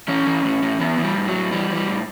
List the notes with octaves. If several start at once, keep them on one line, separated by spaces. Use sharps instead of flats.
E3 C#4
E3
A2
A2
E3 B3
E3
G3
A2
F#3
A2
E3 G3
E3
G3
A2